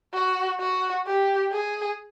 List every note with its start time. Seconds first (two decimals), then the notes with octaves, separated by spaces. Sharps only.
0.13 F#4
0.60 F#4
1.06 G4
1.52 G#4